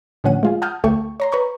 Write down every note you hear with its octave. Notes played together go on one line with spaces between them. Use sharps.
A2 D3 F3 C#4 F#5 D#7
G#3 F4 G#4
F#5 A5 D#6 F6 G6
D2 A3 A4 G5 C#6
C#5 A#5 C6
B4 A#5 C#6 G6